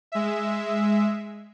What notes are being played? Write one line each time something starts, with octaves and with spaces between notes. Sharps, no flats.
G#3 E5